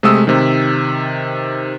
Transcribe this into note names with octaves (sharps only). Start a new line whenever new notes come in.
C3 G#3 A3 D#6 E6
C3 D#3